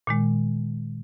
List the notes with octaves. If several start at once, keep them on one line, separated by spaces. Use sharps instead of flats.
A#2 D#3 G#3